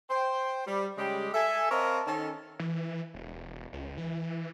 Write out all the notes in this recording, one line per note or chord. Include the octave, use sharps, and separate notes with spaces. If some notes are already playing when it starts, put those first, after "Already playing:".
C5 G5
G3
C#3 G3 G#3 G4
A4 E5 G#5
C4 A#4 C#5 D#5 F5 A5
D#3 C#4 A4
E3
E1
C#2
E3